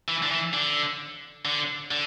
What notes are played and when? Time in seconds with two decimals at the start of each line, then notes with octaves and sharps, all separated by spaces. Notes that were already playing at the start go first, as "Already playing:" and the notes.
0.08 E3
0.23 D3
0.31 E3
0.53 D3
1.45 D3
1.91 D3